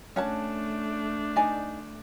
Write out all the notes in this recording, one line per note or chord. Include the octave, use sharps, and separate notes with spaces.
A3 C#4 D4 F#5 A5
D#4 D5 G#5